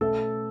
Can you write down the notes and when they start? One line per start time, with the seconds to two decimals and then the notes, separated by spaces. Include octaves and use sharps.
0.01 B2 A3 C#4 A4